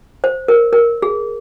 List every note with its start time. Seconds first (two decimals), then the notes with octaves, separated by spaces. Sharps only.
0.24 C5
0.48 A#4
0.73 A#4
1.02 G#4